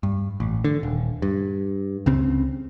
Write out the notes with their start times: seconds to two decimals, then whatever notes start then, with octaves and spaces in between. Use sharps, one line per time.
0.03 G2
0.40 A1
0.64 D3
0.83 D#1
1.22 G2
2.06 C#2 C#3 C4